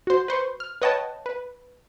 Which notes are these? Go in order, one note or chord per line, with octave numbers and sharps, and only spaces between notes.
F#4 C5
B4 C5 C#6
F6
B4 C#5 D#5 F#5 G5 A5
B4